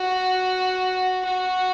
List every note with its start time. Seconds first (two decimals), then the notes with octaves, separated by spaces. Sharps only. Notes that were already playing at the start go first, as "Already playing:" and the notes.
Already playing: F#4
1.25 F#4